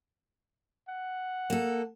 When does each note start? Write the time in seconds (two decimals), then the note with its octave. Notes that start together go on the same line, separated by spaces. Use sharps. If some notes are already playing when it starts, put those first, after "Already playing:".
0.89 F#5
1.50 A#3 A4